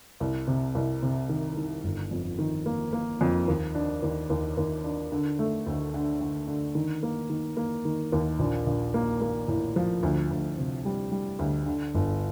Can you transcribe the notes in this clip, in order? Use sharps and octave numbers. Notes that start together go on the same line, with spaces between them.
C2
C3
C2
C3
D#3
D#3
G1
F2
D#3
A#3
A#3
F2
D#2
D4
D#2
D#2
D#2
D4
D3
A3
D2
D3
D3
D3
D#3
A#3
D#3
A#3
D#3
D#2
A#1
A#1
A#3
A#3
A2
F3
D2
D2
C3
G3
G3
D2
D3
G1